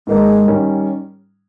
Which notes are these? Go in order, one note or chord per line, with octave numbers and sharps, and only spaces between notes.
G#2 D#3 G#3 A#3 D#4 A#4
D#3 G3 C#4